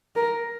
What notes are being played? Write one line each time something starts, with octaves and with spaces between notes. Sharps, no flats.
A#4